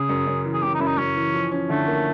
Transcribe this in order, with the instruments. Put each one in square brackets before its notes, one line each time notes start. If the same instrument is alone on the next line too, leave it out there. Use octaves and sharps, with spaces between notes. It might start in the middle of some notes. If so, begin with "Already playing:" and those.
Already playing: [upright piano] C#3 [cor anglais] G#4
[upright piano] F#2
F#2
E3
[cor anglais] G#4
[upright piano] C#3 [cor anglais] G4
[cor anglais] D#4
[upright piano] F#2 [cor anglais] E4
[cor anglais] D#4
[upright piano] F#2 [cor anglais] C#4
[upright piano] E3
F3
C#4
[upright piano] D3 [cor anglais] A3
[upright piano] A#3